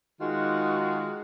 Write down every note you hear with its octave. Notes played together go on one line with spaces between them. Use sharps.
D#3 G#3 F4 F#4